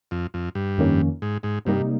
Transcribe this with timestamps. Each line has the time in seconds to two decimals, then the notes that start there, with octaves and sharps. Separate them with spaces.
0.11 F2
0.34 F2
0.55 G2
0.78 F2 D#3 A#3 C#4
1.22 G#2
1.43 G#2
1.65 G2 C3 G3 A#3 D#4